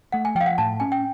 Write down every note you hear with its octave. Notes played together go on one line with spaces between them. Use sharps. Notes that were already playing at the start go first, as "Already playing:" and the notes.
A3 F#5
G#5
F3 G5
F5
F#5
A2 A5
C#4 G#5
G5